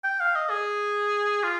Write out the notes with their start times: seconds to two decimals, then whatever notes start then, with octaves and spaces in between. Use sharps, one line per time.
0.04 G5
0.20 F5
0.36 D#5
0.50 G#4
1.43 F4